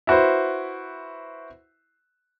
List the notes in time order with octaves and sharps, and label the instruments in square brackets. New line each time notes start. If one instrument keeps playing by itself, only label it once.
[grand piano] E4 F#4 B4 C5